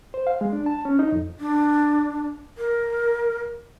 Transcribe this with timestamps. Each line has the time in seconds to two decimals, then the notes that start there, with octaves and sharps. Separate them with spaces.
0.14 C5
0.27 F5
0.41 G#3
0.53 D4
0.66 A5
0.85 C#4
0.99 D#4
1.12 F2
1.40 D4
2.58 A#4